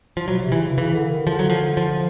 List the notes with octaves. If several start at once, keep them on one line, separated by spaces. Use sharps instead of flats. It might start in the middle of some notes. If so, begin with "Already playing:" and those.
F3
B2 F#3
C3
E3
C#3
C#3 E3
D3
E3
D#3
D3 F3
F#3
F3
F3